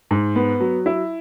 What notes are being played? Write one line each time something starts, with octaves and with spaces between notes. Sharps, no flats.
G#2
B3
F#3
E4